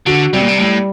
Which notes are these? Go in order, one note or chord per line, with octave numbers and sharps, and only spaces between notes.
D3 F#4
C3 G3
A#2
C3
A2 G3